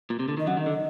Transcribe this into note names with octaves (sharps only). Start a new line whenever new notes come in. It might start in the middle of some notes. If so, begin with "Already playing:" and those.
A#2
C3
D3
D#3 D#5
F#2 F#3 F#5
D#3
D3 D#5